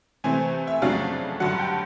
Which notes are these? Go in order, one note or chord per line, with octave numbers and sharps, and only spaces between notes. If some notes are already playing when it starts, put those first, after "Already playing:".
C3 E3 A3 C4 G#5
E5
F2 C#3 F#3 A3 D4 F5
G2 D3 F#3 F#5
G5